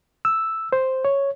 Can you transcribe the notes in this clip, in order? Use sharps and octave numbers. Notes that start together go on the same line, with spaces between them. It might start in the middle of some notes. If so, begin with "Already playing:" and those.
E6
C5
C#5